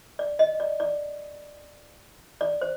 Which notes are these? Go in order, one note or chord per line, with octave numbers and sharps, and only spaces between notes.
D5
D#5
D5
D5
D5
C5